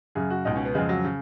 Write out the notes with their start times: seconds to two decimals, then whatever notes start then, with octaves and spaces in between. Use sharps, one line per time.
0.15 F#2 C#3 G#4
0.30 F#4
0.45 C#2 B2 D#4
0.56 C#4
0.65 B3
0.75 F2 C#3 G#3
0.89 F#3
1.04 C#3